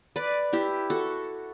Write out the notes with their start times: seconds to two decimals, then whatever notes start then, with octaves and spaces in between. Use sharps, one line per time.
0.16 B4 D5
0.53 E4 G4
0.90 F#4 A4